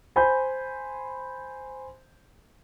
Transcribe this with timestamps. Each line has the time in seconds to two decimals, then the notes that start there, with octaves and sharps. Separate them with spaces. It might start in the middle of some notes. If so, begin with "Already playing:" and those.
0.16 C5 G#5 B5 C6 G6